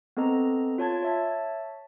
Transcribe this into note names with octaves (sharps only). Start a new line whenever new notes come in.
B3 C4 A4 D#5 A#5
F4 C#5 A5 G#6
C#5 E5 A5